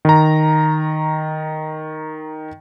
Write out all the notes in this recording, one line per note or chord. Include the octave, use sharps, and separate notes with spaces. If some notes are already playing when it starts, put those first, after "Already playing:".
D#3 A#5